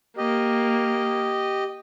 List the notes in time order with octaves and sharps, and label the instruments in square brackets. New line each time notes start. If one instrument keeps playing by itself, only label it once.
[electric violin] A#3 [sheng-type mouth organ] G4 D#5